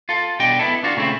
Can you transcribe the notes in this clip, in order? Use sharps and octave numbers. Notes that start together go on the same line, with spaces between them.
F4 A4
B2 G3 D4 D#5 G5
B3 E4 A4
D4 F4 F#4
A#2 C#3 A3 C4 E4